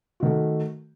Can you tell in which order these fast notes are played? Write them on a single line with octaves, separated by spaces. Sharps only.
F#4 D#3 A3